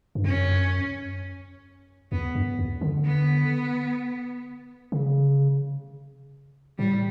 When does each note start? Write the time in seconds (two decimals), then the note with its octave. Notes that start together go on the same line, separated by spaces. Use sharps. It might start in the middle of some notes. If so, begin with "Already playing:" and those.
0.15 G2
0.24 F#2 C#4
2.12 E2 B3
2.35 F#2
2.59 E2
2.81 D3
3.05 B3
4.92 C#3
6.79 A2 G3